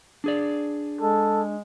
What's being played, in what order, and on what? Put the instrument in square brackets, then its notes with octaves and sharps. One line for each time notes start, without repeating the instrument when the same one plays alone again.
[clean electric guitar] D4 G#4 D5
[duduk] G#3 [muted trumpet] A4